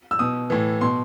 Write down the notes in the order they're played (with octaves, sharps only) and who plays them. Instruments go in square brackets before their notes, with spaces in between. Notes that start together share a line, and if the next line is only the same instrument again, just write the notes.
[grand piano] E6
B2 D#6
A2 E3
B2 C6